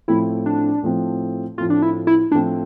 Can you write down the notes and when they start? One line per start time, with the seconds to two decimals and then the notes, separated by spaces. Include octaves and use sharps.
0.08 A2 F3 A3 C4 E4
0.46 D4
0.83 A2 F3 A3 C4
1.57 A2 F3 A3 C4 F4
1.70 D4
1.82 E4
2.07 E4
2.31 A2 F3 A3 C4 D4